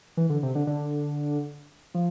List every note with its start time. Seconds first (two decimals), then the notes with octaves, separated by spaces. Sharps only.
0.17 E3
0.29 D3
0.43 C3
0.55 D3
0.67 D3
1.94 F3